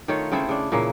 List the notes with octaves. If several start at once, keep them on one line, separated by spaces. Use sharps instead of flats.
D#3 A3 F4 C#5
C#3 C4 E4 A4
C#3 D4
A#2 C#3 E3 A#3